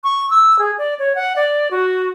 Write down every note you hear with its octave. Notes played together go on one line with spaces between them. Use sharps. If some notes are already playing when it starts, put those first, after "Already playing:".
C#6
E6
G#4
D5
C#5
F#5
D5
F#4